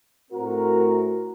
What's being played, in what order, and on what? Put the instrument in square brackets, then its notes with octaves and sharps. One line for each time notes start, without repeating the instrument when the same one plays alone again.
[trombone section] A2 A3 C4 F#4 A#4